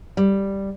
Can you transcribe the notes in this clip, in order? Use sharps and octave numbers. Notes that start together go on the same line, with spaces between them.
G3